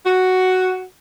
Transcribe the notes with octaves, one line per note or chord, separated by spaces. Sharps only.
F#4